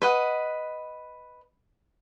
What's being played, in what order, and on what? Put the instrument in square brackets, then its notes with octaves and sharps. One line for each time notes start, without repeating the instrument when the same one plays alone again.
[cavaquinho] B4 D#5 F#5